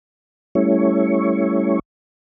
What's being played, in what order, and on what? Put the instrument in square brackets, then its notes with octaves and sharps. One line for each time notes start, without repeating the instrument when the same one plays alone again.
[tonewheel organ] G3 A3 C#4 E4 C#5